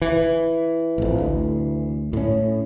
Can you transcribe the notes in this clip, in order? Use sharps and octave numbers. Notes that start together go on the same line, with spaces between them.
E3
A1 F2
D2
A2 C#4